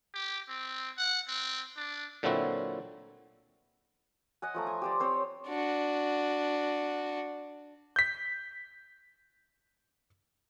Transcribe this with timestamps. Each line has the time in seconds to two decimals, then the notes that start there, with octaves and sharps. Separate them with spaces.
0.14 G4
0.49 C4
0.98 F#5
1.28 C4
1.77 D4
2.23 A#2 D3 F#3 C4 E4 F#4
4.42 D#5 F#5 G#5
4.54 F3 A3 A#5
4.67 G#5
4.82 G4 C5 D5
5.00 C4 C5 C#5
5.48 D4 F#4
7.96 G6 B6